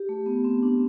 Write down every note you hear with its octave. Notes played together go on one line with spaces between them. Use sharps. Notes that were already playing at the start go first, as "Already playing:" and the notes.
Already playing: G4
A3
B3
C4
D4